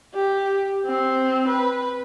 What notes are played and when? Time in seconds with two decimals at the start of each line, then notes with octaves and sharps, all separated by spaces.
0.14 G4
0.86 C4
1.48 B4